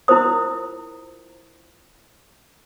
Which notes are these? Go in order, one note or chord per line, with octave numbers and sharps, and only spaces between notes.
E4 F4 A#4 C5 D#6